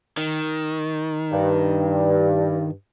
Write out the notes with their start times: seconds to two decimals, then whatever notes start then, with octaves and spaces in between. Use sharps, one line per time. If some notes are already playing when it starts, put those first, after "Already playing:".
0.17 D#3
1.32 G2